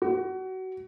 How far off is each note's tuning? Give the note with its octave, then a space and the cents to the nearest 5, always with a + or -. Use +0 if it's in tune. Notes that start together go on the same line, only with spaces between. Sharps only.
F#4 +25